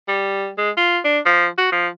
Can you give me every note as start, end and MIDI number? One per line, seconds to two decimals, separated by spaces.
0.08 0.50 55
0.58 0.70 56
0.77 0.98 65
1.05 1.19 62
1.26 1.46 53
1.58 1.70 66
1.72 1.87 53